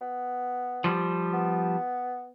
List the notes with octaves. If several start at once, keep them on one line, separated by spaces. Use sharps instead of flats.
B3
F3 G3
B3